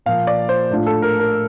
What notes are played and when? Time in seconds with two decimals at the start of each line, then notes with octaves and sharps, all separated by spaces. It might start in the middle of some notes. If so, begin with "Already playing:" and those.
0.06 A#2 F3 A#3 F5
0.27 D5
0.49 C5
0.71 A2 A3 D4 F4
0.86 A4
1.02 A#4
1.19 A#4